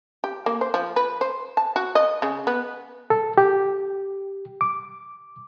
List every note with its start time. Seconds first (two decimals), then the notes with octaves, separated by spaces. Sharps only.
0.24 G4
0.46 A#3
0.61 C5
0.74 F3
0.96 B4
1.21 C5
1.57 A5
1.76 F#4
1.95 D#5
2.22 C#3
2.47 B3
3.10 A4
3.38 G4
4.61 D6